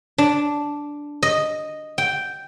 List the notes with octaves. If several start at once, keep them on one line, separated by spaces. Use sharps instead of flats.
D4
D#5
G5